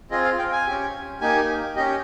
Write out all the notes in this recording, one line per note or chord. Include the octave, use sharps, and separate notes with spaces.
C4 F4 G#4 D#5
F5
G5
G#5
C#4 G4
A#3 D#4 G4 G#5
C#4 G4 D#5